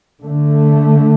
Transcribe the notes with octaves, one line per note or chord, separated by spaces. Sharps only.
D3 A3